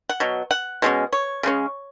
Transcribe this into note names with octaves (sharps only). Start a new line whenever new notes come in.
F#5
B2 F#3
F#5
B2 G#3 C#4
C#5
C#3 G#3 C#4